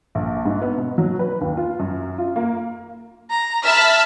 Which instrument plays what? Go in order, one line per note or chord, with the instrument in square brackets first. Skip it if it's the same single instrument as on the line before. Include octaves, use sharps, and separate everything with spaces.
[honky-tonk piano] A#1
G#2
B3
B2
F#3
B4
D#2
F4
F#2
F4
A#3
[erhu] A#5
[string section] E5 A5 B5 [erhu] F6